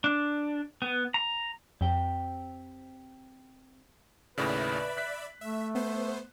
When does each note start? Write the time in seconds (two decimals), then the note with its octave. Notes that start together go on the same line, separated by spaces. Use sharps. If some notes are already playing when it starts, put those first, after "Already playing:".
0.04 D4
0.82 B3
1.14 A#5
1.81 F2 C4 G4 G5
4.38 D#2 A2 C#3 B4 D5 E5 B5
4.97 F#6 B6
5.41 A3 E5
5.75 B3 C5